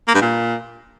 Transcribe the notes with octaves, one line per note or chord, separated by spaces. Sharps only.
A#3
G2
A#2